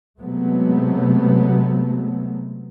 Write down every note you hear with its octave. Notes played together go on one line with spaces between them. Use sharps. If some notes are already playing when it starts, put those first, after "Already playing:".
C3 F#3 G#3 A3 B3